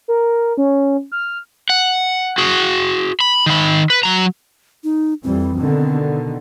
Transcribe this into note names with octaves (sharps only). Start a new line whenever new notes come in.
A#4
C#4
F6
F#5
F#4 G#4
B5
D#3 B5
B4
F#3 A#5
D#4
F2 E3 G3 C4
B2 D3 D#3